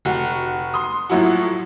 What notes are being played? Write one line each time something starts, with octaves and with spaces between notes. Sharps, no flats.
F1 F#4
C6 D#6
A2 F3 F#3 E4 F#4